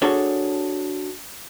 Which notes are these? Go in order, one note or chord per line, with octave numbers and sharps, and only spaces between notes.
D4 F#4 G#4 A4 C#5